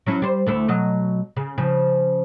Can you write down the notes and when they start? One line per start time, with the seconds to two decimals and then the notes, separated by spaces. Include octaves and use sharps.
0.06 F#3 C#4 E4
0.22 G3 C5
0.46 D2 A3 E4
0.68 B2 F#3 D#5
1.37 C#3
1.58 C#3 F3